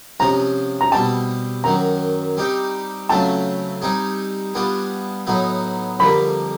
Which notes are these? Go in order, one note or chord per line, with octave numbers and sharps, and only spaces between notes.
C3 F3 G#3 C#4 A#5
A#5
B2 G3 C4 A5
F#2 D#3 F#3 A#5
G3 C4 D#4 G4
C#3 F#3 A3 C4 F4 A5
G3 C4 D#4 G#4
G3 B3 D4 F4 G#4
A2 F#3 B3 D#4
F2 D3 G3 A#3 B5